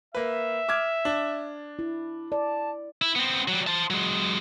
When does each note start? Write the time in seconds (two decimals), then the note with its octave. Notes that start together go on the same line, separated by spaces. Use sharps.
0.15 A#3 B4 E5
0.69 D6 F6 G#6
1.05 D4
1.79 E4
2.32 D5 A5
3.02 E4
3.16 B3 C4
3.48 F#3 G3
3.67 C5 A5
3.90 F#3 G#3